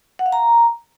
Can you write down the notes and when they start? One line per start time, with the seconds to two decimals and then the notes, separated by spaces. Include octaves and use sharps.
0.19 F#5
0.26 F5
0.32 A#5